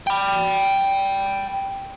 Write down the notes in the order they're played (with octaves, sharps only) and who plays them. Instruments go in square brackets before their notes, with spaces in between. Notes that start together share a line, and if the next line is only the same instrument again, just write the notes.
[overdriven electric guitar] G5 B5